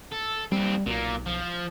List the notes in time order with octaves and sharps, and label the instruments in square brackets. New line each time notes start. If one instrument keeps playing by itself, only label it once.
[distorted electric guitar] A4
[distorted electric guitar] D#2 C4 [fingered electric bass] G3
[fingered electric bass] B1 [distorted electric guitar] A#2 A#3
[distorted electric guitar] F3